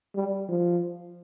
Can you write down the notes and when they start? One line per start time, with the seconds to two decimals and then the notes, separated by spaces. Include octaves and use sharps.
0.15 G3
0.49 F3